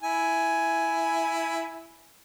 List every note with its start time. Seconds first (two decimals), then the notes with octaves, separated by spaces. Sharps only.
0.03 E4 G#5